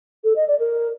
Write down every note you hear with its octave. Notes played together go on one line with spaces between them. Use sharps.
A4
D#5
D5
A#4